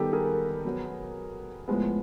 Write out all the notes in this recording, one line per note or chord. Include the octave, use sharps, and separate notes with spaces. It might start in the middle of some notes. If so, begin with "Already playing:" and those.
Already playing: D#3 G3 B3 G4 A4
G#4 A#4
B2 F#3 B3
A2 F3 G#3 B3